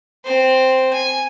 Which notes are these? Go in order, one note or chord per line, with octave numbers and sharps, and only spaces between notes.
C4 C5
G#5